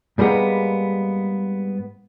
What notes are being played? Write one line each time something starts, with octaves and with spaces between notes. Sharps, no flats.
G#2 G3 G#3 A#3 B3